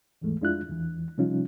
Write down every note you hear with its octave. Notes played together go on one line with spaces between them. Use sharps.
D#2 G#2 E3 G#3 A3
F2 G#3 D4 E4 F4 F#6
E2 E3
C3 F3 G3 C#4 D#4 F4